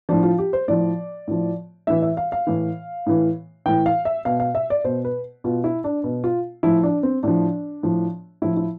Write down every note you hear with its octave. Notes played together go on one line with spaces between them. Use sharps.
A2 F3 D4
F4
G4
C5
A2 F3 D5
A2 F3
A2 E3 E5
E5
F5
F5
A2 E3
A2 E3
A2 E3 G5
F5
E5
B2 F5
F5
E5
D5
B2 C5
B4
B2 F4
E4
D4
B2
F4
A2 F3 E4
D4
C4
A2 F3 D4
A2 F3
A2 F3 E4
E4